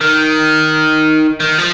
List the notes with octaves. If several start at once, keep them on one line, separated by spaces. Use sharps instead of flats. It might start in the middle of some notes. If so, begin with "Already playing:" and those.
D#3
D#3
F3